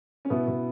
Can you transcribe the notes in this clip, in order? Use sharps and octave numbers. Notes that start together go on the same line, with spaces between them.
C#4
B2 B3 E4
B2